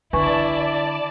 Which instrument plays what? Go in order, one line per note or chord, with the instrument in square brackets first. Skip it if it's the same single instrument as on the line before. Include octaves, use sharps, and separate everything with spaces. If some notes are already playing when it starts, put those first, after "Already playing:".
[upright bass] D3 [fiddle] E4 [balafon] B4 G#5 C#6 [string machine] D5 A5